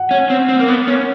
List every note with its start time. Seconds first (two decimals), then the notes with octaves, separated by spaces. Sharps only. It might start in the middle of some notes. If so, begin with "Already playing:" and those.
Already playing: F#5
0.11 C#4
0.30 C4
0.49 C4
0.59 A#3
0.68 B3
0.87 C#4